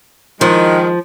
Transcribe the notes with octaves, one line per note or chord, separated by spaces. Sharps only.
D#3 F3 G#3